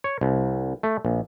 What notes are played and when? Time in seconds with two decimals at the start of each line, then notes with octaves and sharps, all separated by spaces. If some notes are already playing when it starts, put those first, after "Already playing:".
0.04 C#5
0.21 C2
0.83 A3
1.05 A#1